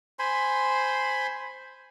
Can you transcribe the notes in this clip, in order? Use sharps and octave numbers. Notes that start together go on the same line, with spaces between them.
C5 G#5 B5 C6